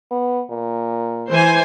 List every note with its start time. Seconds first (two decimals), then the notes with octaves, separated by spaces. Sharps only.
0.11 B3
0.49 A#2
1.29 E3 C5 G#5